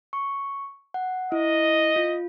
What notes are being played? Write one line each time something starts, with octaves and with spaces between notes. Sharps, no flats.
C#6
F#5
E4 D#5
F4